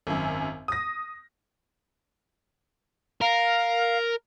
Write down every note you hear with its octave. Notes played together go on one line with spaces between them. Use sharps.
G#1 F#2
D#6 A#6
A#4 F5